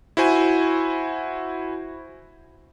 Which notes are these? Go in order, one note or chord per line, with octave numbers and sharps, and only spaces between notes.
E4 F#4 C5 G#5